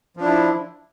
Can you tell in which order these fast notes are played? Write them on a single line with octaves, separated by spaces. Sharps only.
F3 D4 E4